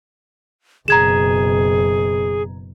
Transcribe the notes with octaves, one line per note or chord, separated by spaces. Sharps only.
F#1 B2 G#4 A#5 G#6 E7